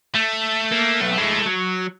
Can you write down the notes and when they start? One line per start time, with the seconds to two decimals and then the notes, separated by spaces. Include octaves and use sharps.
0.15 A3
0.72 A#3
1.01 B1
1.18 G#3 E4
1.46 F#3